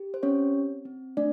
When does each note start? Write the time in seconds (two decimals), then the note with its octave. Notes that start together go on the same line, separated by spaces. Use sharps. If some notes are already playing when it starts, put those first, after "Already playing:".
Already playing: G4
0.14 C5
0.23 C4 C#4 C#5
0.54 C4
0.85 C4
1.17 A3 D4 D5